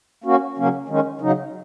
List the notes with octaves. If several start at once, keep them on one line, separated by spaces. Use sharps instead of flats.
A#3 C#4 F#4
C#3 F#3 A#3 C#4
D#3 G#3 C#4
C#3 F#3 D#4